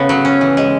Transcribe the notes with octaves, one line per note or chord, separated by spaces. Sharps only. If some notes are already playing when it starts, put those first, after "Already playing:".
Already playing: C#3 A3 B3
F#3
C#4
E3
G#3